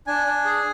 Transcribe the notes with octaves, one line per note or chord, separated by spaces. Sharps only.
D4 G#5
D4
G#4